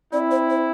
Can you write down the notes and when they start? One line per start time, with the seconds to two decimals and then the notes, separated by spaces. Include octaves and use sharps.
0.13 C4 E4 D5
0.31 C5
0.50 C5